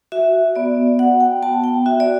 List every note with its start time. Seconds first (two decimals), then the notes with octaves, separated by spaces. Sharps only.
0.12 F#4 E5
0.56 B3 D5
0.99 F#4 F#5
1.20 G5
1.42 B3 A5
1.64 G5
1.86 F#4 E5
2.00 D5